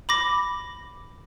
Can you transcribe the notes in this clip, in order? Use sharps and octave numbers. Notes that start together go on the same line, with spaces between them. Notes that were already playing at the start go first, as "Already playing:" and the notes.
B5 D6 A#6